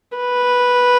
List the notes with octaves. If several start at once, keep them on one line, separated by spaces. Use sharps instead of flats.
B4